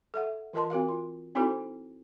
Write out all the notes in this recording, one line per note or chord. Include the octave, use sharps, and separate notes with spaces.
A4 E5 F#5
E3 F4 A#4 D#5 A5 C6
C4 F#4 A#4 F5
F4
C4 D#4 E4 F#4 A4 C5